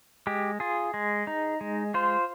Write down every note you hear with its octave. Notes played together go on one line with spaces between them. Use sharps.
G#3 G4
F4 G#4
G#3
D#4
G#3
F4 C5